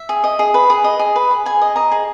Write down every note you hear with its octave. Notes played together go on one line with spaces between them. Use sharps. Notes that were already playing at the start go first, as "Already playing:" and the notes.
Already playing: E5
G#4
D#5
G#4
B4
G#4
D#5
G#4
B4
G#4
G#4 G#5
D#5
D#5 A#5
G#4